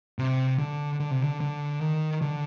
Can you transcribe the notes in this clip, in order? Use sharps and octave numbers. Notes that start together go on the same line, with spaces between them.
C3
D3
D3
C3
D3
D3
D#3
D3